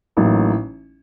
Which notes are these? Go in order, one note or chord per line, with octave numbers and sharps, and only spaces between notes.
A1 A2 F#3 A#3 D#4